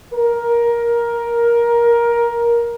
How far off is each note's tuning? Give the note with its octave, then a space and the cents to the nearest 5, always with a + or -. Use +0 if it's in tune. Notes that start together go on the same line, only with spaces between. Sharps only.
A#4 +15